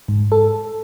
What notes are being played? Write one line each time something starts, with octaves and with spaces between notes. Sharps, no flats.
G#2
A4